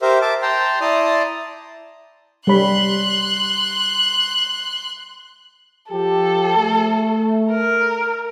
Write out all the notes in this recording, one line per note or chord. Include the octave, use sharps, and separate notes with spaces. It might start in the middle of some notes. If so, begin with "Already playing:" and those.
G4 A#4 C5 E5
E5 A5 D6
G5 A5 A#5 C6
E4 D5 A5 A#5 C6 D#6
G3 C#5 B5 C6 F#6
F3 G4 A4
A3
A#4